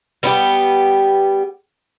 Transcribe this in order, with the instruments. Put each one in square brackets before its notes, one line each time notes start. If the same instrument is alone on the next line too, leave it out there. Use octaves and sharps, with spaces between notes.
[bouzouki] G3 B3 D#4 G4